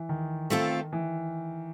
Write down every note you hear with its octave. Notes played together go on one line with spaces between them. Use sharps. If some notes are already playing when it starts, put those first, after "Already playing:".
Already playing: E3
D#3
A3 C4 F4 A4
E3